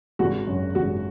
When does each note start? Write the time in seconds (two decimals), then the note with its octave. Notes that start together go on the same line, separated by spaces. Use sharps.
0.19 G#1 F#4
0.47 F#2
0.75 G#1 F#4